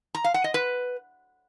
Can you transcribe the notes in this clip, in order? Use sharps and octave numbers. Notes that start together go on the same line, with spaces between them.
A#5
F5
F#5
D#5
B4